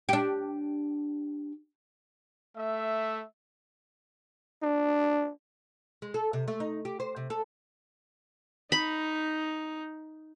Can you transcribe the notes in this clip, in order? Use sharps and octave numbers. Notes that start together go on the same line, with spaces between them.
D4 G4
A3 E5
D4
G#3
A4
C3
A3
D#4
G4
C5
C3
A4
D#4 B5